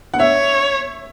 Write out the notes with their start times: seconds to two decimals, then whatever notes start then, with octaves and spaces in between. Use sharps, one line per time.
0.14 F#5
0.20 C#5 E5